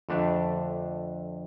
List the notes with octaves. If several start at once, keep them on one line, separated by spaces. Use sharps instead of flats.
F2 D3 A3 D4